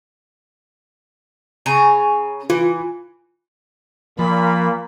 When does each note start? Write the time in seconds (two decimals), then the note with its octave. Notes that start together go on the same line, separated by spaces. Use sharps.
1.66 C#3 G#5 A#5
2.50 E3 F4
4.19 A#2 F3 A#3 B5